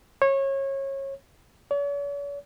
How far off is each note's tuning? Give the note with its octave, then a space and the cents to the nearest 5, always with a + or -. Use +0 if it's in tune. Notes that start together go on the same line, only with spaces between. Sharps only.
C#5 -25
C#5 +45